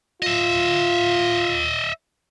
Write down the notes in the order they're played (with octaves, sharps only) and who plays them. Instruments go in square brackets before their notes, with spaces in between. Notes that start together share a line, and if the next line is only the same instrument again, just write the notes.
[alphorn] F4 [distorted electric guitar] D#5 E5